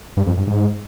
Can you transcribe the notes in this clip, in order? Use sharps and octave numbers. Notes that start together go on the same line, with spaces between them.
G2
F2
G2
G#2